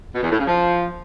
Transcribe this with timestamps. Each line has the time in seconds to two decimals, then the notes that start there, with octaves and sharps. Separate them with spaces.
0.15 B2
0.23 E2
0.31 A2
0.39 C#3
0.47 F3